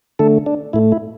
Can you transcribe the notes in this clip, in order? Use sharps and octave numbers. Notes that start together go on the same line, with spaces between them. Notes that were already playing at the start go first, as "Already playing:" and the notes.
D3 A3 A4
D4
A2 A3 E4
E4